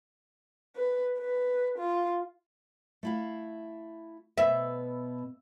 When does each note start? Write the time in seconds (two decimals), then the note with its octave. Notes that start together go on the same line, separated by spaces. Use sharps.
0.76 B4
1.18 B4
1.79 F4
3.03 A3 E4 F5
4.38 B2 B3 E5